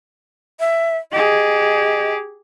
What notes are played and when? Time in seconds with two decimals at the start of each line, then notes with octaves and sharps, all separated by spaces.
0.60 E5
1.12 G4 G#4 D#5